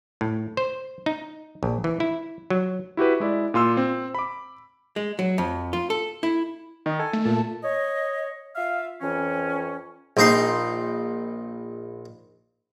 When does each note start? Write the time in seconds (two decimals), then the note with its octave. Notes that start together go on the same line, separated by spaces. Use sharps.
0.21 A2
0.57 C5
1.06 D#4
1.63 A#1
1.84 E3
2.00 E4
2.50 F#3
2.97 E4 F#4 G4 B4
3.20 G#3 E4 D5
3.54 A#2 F4 C6 E6
3.77 C4
4.15 B5 D6
4.96 G#3
5.19 F#3
5.38 F2
5.73 F4
5.90 A4
6.23 E4
6.86 D#3 D#5
7.00 A4 G#5
7.13 A3
7.25 A#2 A5
7.63 C#5 D#5
8.55 F4 E5 F5
9.01 F2 E3 C#4
10.17 A#1 D#4 C6